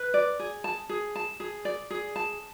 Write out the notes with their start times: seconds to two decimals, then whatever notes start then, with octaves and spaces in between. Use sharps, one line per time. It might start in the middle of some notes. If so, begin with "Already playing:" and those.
Already playing: B4
0.14 D5
0.39 G#4
0.64 A5
0.89 G#4
1.16 A5
1.40 G#4
1.65 D5
1.91 G#4
2.16 A5